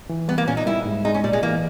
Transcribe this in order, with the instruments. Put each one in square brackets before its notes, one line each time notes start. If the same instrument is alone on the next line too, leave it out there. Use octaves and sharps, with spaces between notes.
[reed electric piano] E3
[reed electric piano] G3 [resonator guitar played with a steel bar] B3
[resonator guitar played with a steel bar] A#3
[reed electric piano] A#2 [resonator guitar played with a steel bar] C#4
[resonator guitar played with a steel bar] D#4
[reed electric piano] G3 [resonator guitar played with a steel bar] E4
[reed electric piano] G#2
[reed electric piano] G#3 [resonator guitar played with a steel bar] D#4
[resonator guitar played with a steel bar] C#4
[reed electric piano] A#2 [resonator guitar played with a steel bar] G3
[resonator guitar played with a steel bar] G#3
[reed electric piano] E3 [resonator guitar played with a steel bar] A#3